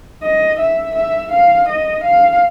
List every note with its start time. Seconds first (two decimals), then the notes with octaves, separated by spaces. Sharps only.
0.23 D#5
0.60 E5
0.95 E5
1.32 F5
1.68 D#5
2.04 F5